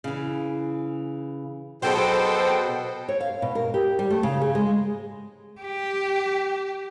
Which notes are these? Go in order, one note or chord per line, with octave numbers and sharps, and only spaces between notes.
C#3 E3
B2 F#3 F#4 G#4 A4 C5 G5
C#5
F5
B2
A#4
G4
G3
A3
C#3
G#4
G#3
G4